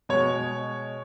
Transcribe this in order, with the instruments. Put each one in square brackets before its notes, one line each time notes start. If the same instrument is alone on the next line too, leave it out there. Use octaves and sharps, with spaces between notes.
[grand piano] B2 G#3 C#5